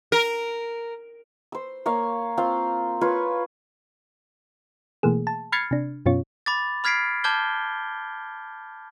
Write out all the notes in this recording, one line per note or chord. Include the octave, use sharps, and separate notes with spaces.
A#4
C5 E6
A#3 C#5 F5
C4 F4 C5 F5
F4 B4 C#5 C#6
B2 E3 A3 A#3 G#4
A5
B5 F6 G#6 A6 C7 C#7
C3 D4
F#2 B2 C#4 F4 C#5
B5 D6 A6
B5 F6 G#6 B6 C7 D7
A5 D6 F6 G6 G#6 G7